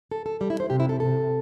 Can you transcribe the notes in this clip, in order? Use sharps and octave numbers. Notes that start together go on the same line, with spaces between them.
A4
A4
G3
E4
C5
C3 G4
E4
A4
C3 A4